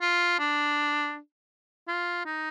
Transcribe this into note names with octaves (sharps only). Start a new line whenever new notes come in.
F4
D4
F4
D#4